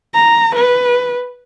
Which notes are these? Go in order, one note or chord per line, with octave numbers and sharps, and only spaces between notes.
A#5
B4